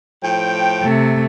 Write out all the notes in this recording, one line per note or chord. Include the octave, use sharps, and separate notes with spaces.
A2 F3 G5
C3 A3